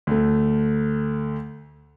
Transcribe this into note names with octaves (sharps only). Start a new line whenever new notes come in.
D2 A3